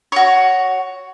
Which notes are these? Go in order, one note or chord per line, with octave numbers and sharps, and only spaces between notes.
F#4 C#5